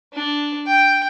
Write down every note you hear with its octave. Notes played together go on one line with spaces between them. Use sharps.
D4
G5